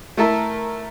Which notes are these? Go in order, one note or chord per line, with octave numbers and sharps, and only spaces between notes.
A3 E4 A4 A#4 E5